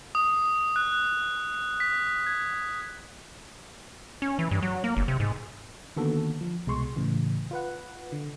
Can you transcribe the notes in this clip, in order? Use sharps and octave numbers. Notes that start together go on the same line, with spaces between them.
D#6
F#6
B6
G#6
C#4
E3
G2
F#3
A#3
G1
C3
G#2
D3 D#3 A#3 B3 F#4 A4
F3
C2 B2 G#3 C6 C#6
A2 C#3 E3
F4 B4 F#5
D3